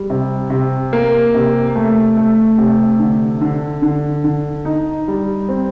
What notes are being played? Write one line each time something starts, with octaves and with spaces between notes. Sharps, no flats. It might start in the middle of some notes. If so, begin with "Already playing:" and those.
Already playing: G3
C3
C3
A#3
C3
A3
A3
C3
D3
D3
D3
D3
D#4
G3
C4